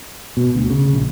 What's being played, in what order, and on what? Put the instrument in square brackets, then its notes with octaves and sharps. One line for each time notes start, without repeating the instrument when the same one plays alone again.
[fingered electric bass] B2
D2
C#3
A#1